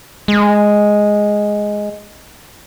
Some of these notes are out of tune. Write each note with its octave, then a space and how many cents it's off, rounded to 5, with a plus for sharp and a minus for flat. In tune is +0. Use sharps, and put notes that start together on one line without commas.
G#3 +0